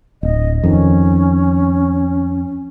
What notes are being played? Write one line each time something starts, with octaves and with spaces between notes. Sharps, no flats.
D1 D#5
F2 D#3 C#4